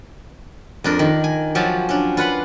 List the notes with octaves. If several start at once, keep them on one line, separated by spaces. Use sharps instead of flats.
F2 D4 A#4
D#3
G#5
F3 F#3 G4 F5 G#5 A5
C#4 D4
F4 B4 F#5 B5